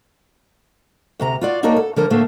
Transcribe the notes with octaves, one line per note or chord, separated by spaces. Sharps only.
D2 C3 A#5
F4 F#4 D5
A#3 D4 D#4 F#4 A#4 C#5
A4
D3 F3 A#4 A5
A2 D3 A3 A#3